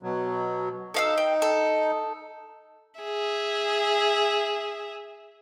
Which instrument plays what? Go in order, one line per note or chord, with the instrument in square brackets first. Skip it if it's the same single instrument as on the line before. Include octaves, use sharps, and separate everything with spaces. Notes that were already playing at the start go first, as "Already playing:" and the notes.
[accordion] B2 F#3
[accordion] D#4 [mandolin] A4 F5 E6
[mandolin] G5
A4
[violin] G#4 E5